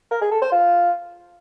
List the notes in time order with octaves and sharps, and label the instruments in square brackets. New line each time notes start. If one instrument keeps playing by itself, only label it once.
[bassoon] A#4
G#4
A4
C5
F4